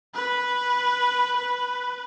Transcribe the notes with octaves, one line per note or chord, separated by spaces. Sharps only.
B4
B4